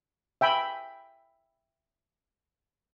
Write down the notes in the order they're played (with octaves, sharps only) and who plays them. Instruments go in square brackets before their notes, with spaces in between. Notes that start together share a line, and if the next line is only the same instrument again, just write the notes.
[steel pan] E5 G5 G#5 B5